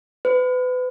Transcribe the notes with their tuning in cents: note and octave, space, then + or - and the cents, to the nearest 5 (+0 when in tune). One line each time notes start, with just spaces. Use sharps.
B4 +30